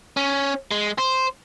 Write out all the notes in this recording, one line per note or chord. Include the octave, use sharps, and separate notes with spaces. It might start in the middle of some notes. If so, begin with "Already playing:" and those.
C#4
G#3
C5